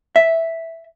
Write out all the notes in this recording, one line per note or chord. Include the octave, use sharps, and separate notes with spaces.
E5